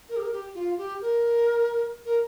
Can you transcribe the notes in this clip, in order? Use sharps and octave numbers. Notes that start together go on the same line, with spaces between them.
A#4
G4
A#4
G4
F4
G4
A#4
A#4